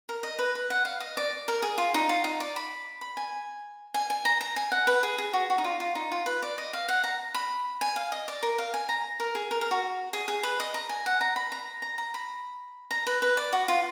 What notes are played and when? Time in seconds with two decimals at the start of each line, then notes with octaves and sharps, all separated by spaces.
0.09 A#4
0.23 D#5
0.39 B4
0.55 B4
0.70 F#5
0.85 F5
1.00 D#5
1.17 D5
1.48 A#4
1.62 G#4
1.78 F4
1.94 D#4
2.09 F4
2.24 D#4
2.40 D5
2.56 B5
3.01 B5
3.17 G#5
3.94 G#5
4.10 G#5
4.25 A#5
4.41 A#5
4.56 G#5
4.72 F#5
4.87 B4
5.03 G#4
5.18 G#4
5.33 F#4
5.50 F#4
5.58 D#4
5.64 F4
5.80 F4
5.95 D#4
6.12 F4
6.26 B4
6.42 D5
6.58 D#5
6.73 F5
6.88 F#5
7.04 A#5
7.34 B5
7.81 G#5
7.96 F5
8.12 D#5
8.28 D5
8.43 A#4
8.58 F5
8.74 G#5
8.89 A#5
9.20 A#4
9.35 G#4
9.51 A#4
9.61 A#4
9.71 F#4
10.13 G#4
10.28 G#4
10.43 B4
10.60 D#5
10.74 A#5
10.89 G#5
11.06 F#5
11.21 A#5
11.36 B5
11.52 A#5
11.82 A#5
11.98 A#5
12.14 B5
12.91 A#5
13.07 B4
13.22 B4
13.37 D5
13.53 F#4
13.68 F4